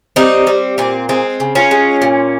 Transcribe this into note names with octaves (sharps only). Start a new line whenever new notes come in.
G3 C4 D#4
G3 C4
A#2 C4
G#3 C4
C#3
C#4 F4
G#3
A#2